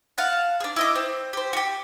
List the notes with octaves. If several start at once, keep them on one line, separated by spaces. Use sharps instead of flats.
F5 F#5 A5
D4 G#4
E4 D#5 D6
C4
G4 C5
F#4 G4